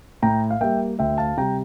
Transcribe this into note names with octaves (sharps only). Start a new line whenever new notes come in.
A2 G5 A#5
F5
G3 A#3 E5 G5
D2 E5 G5
F5 A5
C3 G3 G5 A#5